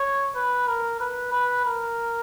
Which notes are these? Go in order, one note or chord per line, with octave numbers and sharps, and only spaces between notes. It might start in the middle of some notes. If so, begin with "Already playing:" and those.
Already playing: C#5
B4
A#4
B4
B4
A#4